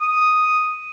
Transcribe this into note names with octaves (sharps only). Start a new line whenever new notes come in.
D#6